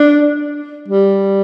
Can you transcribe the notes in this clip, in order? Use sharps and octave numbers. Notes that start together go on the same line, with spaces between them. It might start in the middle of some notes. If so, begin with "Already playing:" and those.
Already playing: D4
G3